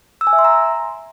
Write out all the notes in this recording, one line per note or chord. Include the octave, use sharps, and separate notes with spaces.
E6
G#5
E5
C6
A#5